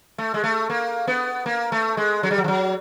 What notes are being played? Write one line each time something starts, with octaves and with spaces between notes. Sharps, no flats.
A3
G#3
A3
A#3
B3
A#3
A3
G#3
F#3
G3
F#3
F3
F#3